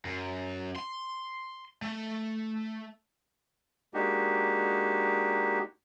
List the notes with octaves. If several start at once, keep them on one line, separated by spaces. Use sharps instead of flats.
F#2
C6
A3
G#3 A#3 D4 D#4 F#4 G4